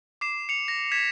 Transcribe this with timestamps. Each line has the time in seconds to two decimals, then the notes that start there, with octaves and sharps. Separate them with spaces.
0.21 D6 C7 E7
0.49 C#7 F7
0.68 A#6
0.92 G#6 B6 E7